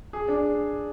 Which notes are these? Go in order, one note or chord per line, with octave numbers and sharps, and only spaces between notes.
G#4
D4